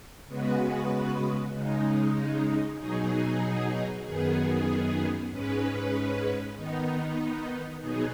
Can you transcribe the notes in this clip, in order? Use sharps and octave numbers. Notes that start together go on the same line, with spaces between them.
C#3 G#3 B3 F#4 B4
C#3 G#3 D#4
B2 F#3 D#4 G#4
F#2 D#3 B3 G#4
G#2 G#3 C#4 B4
D#3 B3 D#4
B2 F#3 B3 D#4 G#4